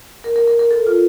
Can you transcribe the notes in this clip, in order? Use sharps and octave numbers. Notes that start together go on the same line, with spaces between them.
A#4
A#4
A#4
A#4
A4
F4